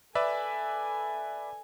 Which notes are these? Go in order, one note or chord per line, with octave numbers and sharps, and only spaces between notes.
A4 B4 D5 E5 G#5